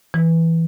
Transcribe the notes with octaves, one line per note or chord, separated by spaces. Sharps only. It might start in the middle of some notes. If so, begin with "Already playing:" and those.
E3